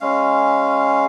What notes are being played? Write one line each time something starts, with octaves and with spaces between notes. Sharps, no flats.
G#3 C#4 F5